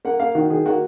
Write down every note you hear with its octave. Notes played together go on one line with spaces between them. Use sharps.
A#3 F#5
A#3 F5
D#3 F#4
D#3 G#4
A#3 F#4